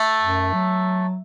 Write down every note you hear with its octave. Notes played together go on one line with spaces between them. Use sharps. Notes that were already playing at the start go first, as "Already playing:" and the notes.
Already playing: A3
F#2
F#3